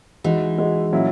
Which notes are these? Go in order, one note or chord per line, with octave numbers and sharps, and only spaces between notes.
E3 G#3 D#4 F#4
G#3 D#4 F#4
A#2 F#3 C#4 E4